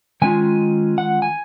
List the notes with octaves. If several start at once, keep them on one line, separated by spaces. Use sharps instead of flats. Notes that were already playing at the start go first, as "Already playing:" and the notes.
D#3 G#3 C#4 F4 G#5
F#5
G#5